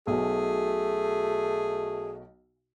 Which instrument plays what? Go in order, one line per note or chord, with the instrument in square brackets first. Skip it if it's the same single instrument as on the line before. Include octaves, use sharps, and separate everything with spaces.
[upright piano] B1 B2 [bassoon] A3 [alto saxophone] G#4